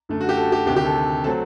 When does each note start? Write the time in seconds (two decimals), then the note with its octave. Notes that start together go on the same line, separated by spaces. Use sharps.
0.09 F#2 D3 A3
0.21 F#4
0.29 G4
0.37 A4
0.52 G4
0.66 D2 C3 D#3 G4
0.76 G4
0.86 A4
1.24 F#3 A3 C4 A4